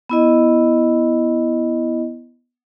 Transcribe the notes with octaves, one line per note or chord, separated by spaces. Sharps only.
B3 E4 D#5